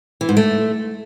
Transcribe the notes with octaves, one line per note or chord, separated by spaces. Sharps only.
E3
G#2
A3